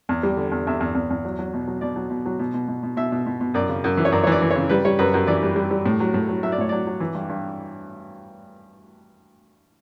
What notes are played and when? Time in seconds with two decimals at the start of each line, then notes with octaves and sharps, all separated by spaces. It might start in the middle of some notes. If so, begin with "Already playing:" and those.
0.09 E2
0.23 G3
0.37 D3
0.52 E2
0.67 E2 E5
0.80 E2
0.95 E2
1.10 E2
1.25 F#3
1.39 F#3
1.54 B2
1.67 F#3
1.81 B2 D5
1.96 F#3
2.10 B2
2.26 F#3
2.39 B2
2.54 B2
2.68 B2
2.83 B2
2.97 B2 E5
3.12 B2
3.26 B2
3.41 B2
3.54 F#2 D5
3.69 C#3
3.84 F#2
3.97 E3
4.05 C#5
4.12 F#2 D5
4.24 C#5
4.27 E3 D5
4.42 E3
4.51 C#3 C#5
4.69 G3 B4
4.85 G3 C#5
4.99 F#2 B4
5.14 F#2
5.27 E3 D5
5.43 G3
5.56 G3
5.71 G3
5.86 A2
6.00 F#3
6.14 A2
6.29 F#3
6.43 F#3 E5
6.52 D5
6.58 A2 C#5
6.69 F#3 D5
6.87 F#3
7.00 E3
7.14 G2
7.29 G2